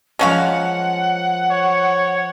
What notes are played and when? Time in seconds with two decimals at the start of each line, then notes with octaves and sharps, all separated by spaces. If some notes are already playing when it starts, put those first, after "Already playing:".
0.19 F3 G#3 C#4 A#4 F5 F#5
1.51 C#5